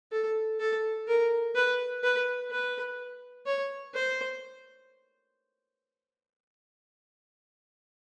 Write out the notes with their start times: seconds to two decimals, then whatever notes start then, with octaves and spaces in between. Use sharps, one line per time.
0.12 A4
0.59 A4
1.07 A#4
1.55 B4
2.03 B4
2.51 B4
3.46 C#5
3.94 C5